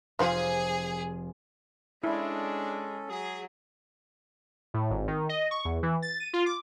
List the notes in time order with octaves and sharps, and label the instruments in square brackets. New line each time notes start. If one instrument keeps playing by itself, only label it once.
[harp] F1 [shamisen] F4 C5 F5 [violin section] G#4
[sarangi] G#3 [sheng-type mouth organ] C#4 A4 [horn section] D4 [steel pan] E4
[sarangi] F#3 [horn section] G#4
[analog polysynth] A2
G#1
D#3
D#5
C#6
E2
E3
A6
D#7
F4
D6